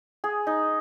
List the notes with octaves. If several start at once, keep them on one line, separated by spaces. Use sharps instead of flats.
G#4
D#4